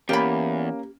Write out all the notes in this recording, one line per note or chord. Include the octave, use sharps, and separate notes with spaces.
E2 A#3 C#4 G4 B5